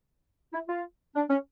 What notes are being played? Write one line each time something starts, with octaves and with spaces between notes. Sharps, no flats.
E4
F4
D4
C#4